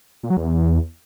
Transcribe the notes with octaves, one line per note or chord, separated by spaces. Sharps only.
A#2
F#3
E2